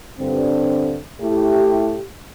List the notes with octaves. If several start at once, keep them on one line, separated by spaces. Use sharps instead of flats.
G2 D3 C4
A2 A3 E4 G4